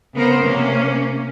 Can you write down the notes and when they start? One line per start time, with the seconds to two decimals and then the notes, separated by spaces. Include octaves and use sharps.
0.14 C#3 B3 A#4 C5
0.43 C3 A#3 C#4